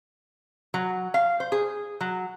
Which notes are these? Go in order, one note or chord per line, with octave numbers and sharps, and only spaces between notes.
F#3
F5
C5
G#4
F#3